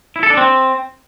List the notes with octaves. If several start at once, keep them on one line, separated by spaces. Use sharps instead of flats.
E4
A4
D4
C4